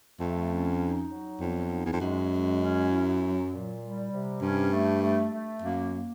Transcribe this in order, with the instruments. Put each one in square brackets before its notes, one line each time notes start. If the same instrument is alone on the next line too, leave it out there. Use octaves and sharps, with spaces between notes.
[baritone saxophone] F2 [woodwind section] A3
[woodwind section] C#4
D#4
F#3
[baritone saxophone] F2 [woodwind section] B3
[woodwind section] D#4
[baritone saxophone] E2
F2
[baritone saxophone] F#2 [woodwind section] G#3
[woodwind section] G#3
C#4
E4
F#3
A#2
G3
C3
[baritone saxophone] G2 [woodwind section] C#4
[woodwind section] A3
A3
A3
[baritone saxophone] F#2 [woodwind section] A#3
[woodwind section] A#3